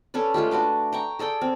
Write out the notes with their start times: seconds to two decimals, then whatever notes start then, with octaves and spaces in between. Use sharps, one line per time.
0.14 C#4 A4 B4 D5
0.34 G#3 A3 F4 G4
0.51 D4 F#4 B4 D6
0.93 G5 A#5 C#6
1.19 G#4 A4 D5 G5
1.41 C4